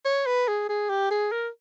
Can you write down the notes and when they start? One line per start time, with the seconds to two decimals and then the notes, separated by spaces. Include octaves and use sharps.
0.05 C#5
0.26 B4
0.48 G#4
0.69 G#4
0.89 G4
1.11 G#4
1.32 A#4